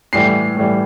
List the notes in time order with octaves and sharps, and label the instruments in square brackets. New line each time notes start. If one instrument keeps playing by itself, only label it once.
[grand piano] A2 E3 G3 C7
A2 E3 G3